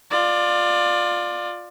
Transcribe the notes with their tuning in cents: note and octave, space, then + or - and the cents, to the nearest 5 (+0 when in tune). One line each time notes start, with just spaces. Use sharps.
F4 +10 D5 +20